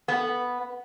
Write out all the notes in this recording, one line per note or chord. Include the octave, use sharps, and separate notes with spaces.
B3